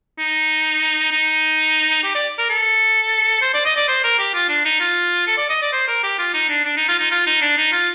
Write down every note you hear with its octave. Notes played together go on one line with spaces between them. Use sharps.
D#4
D#4
G4
D5
A#4
A4
C5
D5
D#5
D5
C5
A#4
G4
F4
D4
D#4
F4
A4
D5
D#5
D5
C5
A#4
G4
F4
D#4
D4
D4
D#4
F4
D#4
F4
D#4
D4
D#4
F4